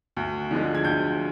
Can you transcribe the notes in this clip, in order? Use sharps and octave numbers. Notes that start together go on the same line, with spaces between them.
D2
D3 F3 G#3
G#6
D2 G6